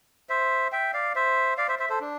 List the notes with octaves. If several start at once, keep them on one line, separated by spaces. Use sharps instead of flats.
C5 E5
E5 G5
D5 F5
C5 E5
D5 F5
C5 E5
C5 E5
A4 C5
D4